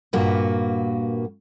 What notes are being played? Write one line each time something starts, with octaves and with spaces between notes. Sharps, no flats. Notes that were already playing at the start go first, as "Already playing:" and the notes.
G2 A#2 A#3 F#4 B4